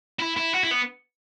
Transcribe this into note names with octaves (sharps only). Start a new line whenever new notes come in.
E4
E4
F#4
E4
B3